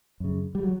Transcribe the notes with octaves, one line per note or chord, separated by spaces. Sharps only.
F#2 C#3
G3
F#3